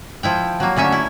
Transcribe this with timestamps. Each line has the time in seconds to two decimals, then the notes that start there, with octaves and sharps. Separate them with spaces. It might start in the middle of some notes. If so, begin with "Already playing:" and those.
0.23 F3 E4 G5
0.60 F#3 A#3
0.76 D3 A3 C#4 E5
0.92 E4